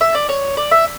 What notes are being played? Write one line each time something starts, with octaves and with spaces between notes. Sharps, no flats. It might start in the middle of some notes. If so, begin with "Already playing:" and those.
E5
D5
C#5
D5
E5